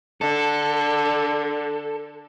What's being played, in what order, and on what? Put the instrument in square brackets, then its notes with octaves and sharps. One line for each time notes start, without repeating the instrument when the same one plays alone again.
[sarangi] D3 [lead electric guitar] A4